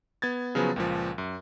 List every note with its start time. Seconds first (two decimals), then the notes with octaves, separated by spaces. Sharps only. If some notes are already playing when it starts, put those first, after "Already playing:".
0.22 B3 G#6 A6
0.55 C#3 F3 F#3 B3 G#4
0.76 C#2 A#2 F3
1.18 F#2